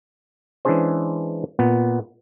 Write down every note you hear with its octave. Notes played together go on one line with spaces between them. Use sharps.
E3 G#3 C#4 D4 G#4 C5
A#2 B3